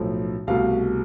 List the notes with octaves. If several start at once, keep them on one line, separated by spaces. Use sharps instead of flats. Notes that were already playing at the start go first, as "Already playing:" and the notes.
Already playing: B1 A2 F3 A3
C2 B2 A3 F5